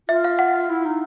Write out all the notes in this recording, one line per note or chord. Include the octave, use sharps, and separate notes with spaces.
F4 E5
F5
F#5
E4
D#4